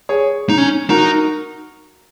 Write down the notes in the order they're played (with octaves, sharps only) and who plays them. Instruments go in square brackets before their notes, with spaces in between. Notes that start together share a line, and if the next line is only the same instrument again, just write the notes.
[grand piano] G#4 C#5
[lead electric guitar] D#4
C#4
[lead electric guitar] D#4 [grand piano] F#4 A#4